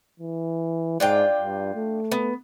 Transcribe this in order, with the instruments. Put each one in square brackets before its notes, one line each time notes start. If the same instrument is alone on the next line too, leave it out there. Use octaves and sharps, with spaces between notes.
[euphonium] E3
[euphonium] G#2 [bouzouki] D4 F4 G5
[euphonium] G2
A3
[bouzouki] B3